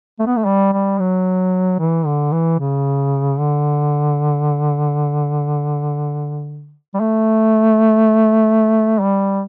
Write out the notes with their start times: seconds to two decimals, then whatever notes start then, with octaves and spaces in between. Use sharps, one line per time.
0.20 A3
0.27 B3
0.36 A3
0.46 G3
0.73 G3
0.99 F#3
1.79 E3
2.06 D3
2.32 E3
2.59 C#3
3.39 D3
6.95 G3
7.00 A3
9.00 G3